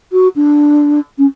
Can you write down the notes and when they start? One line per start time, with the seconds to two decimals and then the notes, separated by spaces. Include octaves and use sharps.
0.12 F#4
0.35 D4
1.18 C#4